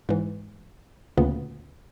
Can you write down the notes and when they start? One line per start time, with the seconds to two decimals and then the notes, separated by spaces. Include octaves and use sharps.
0.09 G#2 E3
1.17 D2 A#2 C#3 B3